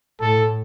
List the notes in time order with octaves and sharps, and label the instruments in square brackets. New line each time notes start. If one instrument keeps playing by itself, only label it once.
[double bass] A2 [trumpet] A4